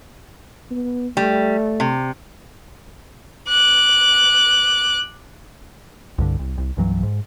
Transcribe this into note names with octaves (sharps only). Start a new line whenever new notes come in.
B3
G3 A3
C3
D6 F#6
C2 G2 D3
C2
C2
C2 G2 E3 F#3
G#2